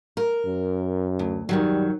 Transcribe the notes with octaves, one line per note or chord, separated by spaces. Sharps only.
A#4
F#2
D2
F#2 D#3 F#3 G3